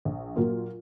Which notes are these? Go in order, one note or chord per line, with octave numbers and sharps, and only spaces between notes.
A#1
A#2 F#3 A#3 F4